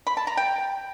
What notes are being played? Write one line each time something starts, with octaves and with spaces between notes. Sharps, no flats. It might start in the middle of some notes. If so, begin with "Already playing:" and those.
B5
A5
A#5
G5